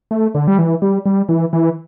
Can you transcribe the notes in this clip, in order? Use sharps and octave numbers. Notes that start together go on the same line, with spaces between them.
A3
D3
G3
E3
G3
G3
E3
E3